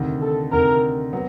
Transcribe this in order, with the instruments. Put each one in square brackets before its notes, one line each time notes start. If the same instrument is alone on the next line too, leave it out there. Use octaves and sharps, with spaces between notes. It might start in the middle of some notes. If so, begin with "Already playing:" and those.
Already playing: [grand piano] D2 C3 D#3
[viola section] A4
[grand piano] D2 C3 D#3 [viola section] A#4
[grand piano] F#3 B3